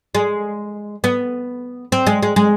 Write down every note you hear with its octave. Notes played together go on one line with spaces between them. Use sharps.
G#3
B3
C4
G#3
G#3
G#3